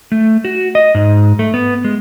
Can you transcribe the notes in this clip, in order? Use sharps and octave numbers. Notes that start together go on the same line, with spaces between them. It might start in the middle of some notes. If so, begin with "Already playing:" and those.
A3
F#4
D#5
G#2
A3
B3
G#3